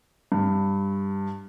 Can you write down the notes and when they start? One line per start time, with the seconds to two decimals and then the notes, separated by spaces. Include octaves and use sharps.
0.32 G2